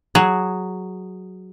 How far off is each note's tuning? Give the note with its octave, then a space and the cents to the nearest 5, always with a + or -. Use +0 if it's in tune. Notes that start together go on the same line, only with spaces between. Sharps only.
F#3 +0 G#4 +0